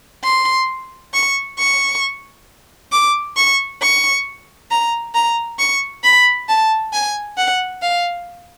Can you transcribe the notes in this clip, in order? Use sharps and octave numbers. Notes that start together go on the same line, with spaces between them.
C6
C#6
C#6
D6
C#6
C#6
A#5
A#5
C#6
B5
A5
G#5
F#5
F5